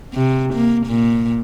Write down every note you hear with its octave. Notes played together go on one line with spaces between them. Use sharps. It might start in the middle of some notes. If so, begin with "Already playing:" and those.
C3
A#3
A#2